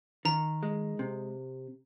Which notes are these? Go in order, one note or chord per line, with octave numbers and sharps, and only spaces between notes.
D#3 A#5
G#3
C3